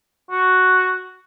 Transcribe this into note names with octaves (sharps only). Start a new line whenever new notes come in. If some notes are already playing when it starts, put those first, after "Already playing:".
F#4